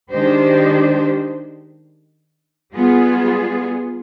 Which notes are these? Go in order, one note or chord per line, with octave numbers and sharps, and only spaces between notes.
D#3 G#3 D4 G4 C5
G3 B3 F4 G#4